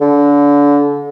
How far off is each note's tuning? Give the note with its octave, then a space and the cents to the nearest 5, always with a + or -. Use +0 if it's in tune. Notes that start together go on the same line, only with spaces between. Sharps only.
D3 -30